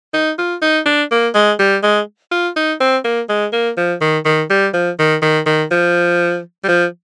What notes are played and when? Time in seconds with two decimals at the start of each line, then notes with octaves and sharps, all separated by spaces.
0.14 D#4
0.38 F4
0.62 D#4
0.86 D4
1.11 A#3
1.35 G#3
1.59 G3
1.83 G#3
2.32 F4
2.56 D#4
2.80 C4
3.04 A#3
3.29 G#3
3.53 A#3
3.77 F3
4.01 D#3
4.25 D#3
4.50 G3
4.74 F3
4.99 D#3
5.22 D#3
5.46 D#3
5.71 F3
6.64 G3
6.68 F3